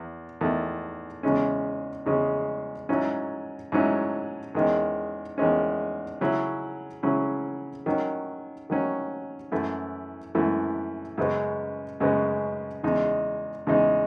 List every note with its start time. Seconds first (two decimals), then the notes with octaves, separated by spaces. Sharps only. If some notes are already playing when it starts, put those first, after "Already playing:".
Already playing: E2
0.41 E2 D#3 A3
1.23 E2 C#3 G#3 C#4
2.06 E2 C#3 G#3 C#4
2.89 G#2 F#3 C#4 E4
3.72 G#2 F#3 C#4 E4
4.55 E2 D#3 G#3 C#4
5.38 E2 D#3 G#3 C#4
6.21 C#3 F#3 C#4 E4
7.03 C#3 F#3 C#4 E4
7.86 D#3 F#3 C#4
8.70 D#3 F#3 C#4
9.52 F#2 E3 A3 E4
10.35 F#2 E3 A3 E4
11.18 F#2 C#3 G#3 B3
12.00 F#2 C#3 G#3 B3
12.83 E2 C#3 G#3 D#4
13.67 E2 C#3 G#3 D#4